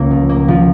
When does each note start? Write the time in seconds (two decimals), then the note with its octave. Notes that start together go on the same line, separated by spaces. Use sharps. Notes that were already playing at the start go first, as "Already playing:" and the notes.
Already playing: C#2 A#3
0.11 F3
0.29 A#3
0.48 F3